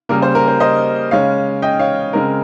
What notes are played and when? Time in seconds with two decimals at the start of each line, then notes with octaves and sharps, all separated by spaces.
0.09 C#3 G3 A#3 A#4
0.22 C5
0.35 A#4
0.48 C5
0.60 C5 D#5
1.11 C#3 G#3 C#4 C#5 F5
1.62 D#5 G5
1.79 C#5 F5
2.13 C#3 G#3 C4 A#4